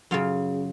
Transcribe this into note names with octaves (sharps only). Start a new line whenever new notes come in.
F#2 C#3 F4 F5